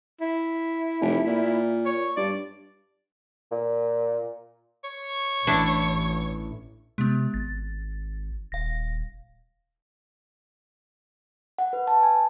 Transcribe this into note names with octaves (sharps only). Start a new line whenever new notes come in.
E4
F1
A#2
C#5
G2 D5
A#2
C#5
A1 D4 E4
C3 G#3 B3
G#1 A6
D#1 F5 A#6
F#5
B4
A5
G#5